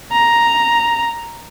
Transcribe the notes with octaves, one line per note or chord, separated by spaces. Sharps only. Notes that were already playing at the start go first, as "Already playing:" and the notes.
A#5